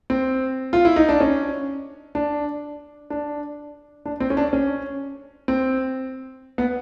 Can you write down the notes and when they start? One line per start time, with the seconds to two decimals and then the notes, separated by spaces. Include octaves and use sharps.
0.10 C4
0.73 F4
0.85 E4
0.96 D#4
1.09 D4
1.20 C#4
2.15 D4
3.10 D4
4.06 D4
4.20 C4
4.30 C#4
4.37 D4
4.53 C#4
5.48 C4
6.58 B3